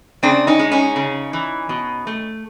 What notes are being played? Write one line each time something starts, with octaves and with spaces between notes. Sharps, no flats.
C#3 C4 D4
C#4 D#4
G#3
C#4 D#4
C#3
E3
B2
A3